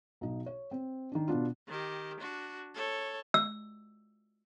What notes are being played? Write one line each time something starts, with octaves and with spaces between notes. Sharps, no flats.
B1 D#4
C#5
C4
D#3 D4
B2 B3 D4 F4
D#3 G4
D4 F#4
A4 C#5
E6